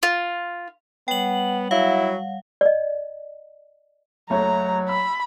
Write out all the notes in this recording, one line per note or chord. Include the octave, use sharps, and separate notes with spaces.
F4
G3 B3 C#5 F#5 G5 F#7
F#3 E4 F5
D5 D#5
F#1 F#3 A3 C#5 A#5
B5 E6